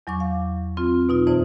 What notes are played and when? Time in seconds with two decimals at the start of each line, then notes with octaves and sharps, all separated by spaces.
0.07 E2 F#3 C#6 D6
0.20 F5
0.77 C4 F4
1.09 B2 D#4 F4
1.27 F2 E3 C5 D5